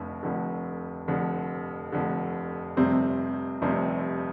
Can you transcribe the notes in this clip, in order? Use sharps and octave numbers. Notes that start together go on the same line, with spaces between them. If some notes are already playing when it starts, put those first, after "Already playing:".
Already playing: F1 F2 D3
F1 F2 D3
F1 F2 D3
F1 F2 D3
F1 F2 C3 G3 C4
F1 F2 C3 G3 C4